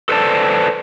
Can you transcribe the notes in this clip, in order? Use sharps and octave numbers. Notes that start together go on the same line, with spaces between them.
A4 B4 C5 D5 A5